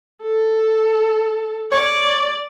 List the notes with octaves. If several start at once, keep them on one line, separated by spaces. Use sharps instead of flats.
A4
C#5 D5